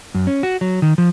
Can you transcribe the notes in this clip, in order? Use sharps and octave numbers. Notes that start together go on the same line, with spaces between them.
F#2
C#4
F#4
F#3
D#3
F3